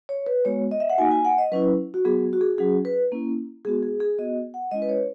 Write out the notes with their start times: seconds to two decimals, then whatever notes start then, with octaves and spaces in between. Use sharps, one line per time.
0.09 C#5
0.27 B4
0.45 G#3 B3 F#4 C#5
0.71 D#5
0.80 E5
0.90 F#5
0.98 A#3 D#4 F#4 G#5
1.11 G#5
1.25 F#5
1.38 D#5
1.52 F#3 C#4 E4 B4
1.94 F#4
2.05 F#3 B3 F#4 G#4
2.33 F#4
2.41 G#4
2.58 F#3 C#4 F#4 G#4
2.85 B4
3.12 A#3 C#4 E4
3.65 G#3 B3 F#4 G#4
3.83 G#4
4.00 G#4
4.19 B3 F#4 D#5
4.54 F#5
4.71 G#3 C#4 E4 D#5
4.82 B4
4.89 C#5